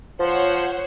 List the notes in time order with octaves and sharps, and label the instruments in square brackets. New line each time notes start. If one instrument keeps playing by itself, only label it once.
[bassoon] F3 [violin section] C5 C#5 F#5